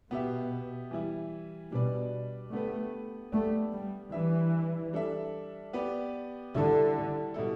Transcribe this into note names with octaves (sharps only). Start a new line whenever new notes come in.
B2 B3 G4 E5
E3 G3 E4
B2 G3 D4 B4 D5
D3 A3 B3 G4 B4
A3 B3 D4 G4 D5
G3
E3 G3 D4 B4 E5
G3 D4 A4 E5
B3 G4 B4 D5
D3 G3 E4 A4
B2 G3 E4 A4